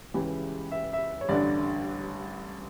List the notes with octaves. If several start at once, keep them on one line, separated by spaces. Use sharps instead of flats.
C#2 C#3 E3 G4
E5
E5
C#5
A1 G2 D3 D5